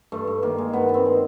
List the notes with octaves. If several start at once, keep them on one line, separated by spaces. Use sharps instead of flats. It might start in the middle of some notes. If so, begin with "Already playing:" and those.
G2 A3
G2
D#3 A#3
G#3
G2 B3
G2
C4
G#3